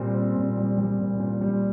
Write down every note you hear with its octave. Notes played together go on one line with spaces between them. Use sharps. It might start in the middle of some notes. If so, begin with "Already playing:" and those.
Already playing: A#2 G3 C4
C4
A#2
G3
G3
A#2
A#2
G3